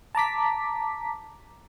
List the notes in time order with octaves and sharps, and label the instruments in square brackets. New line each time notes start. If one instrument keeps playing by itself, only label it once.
[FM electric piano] A5 A#5 D6 B6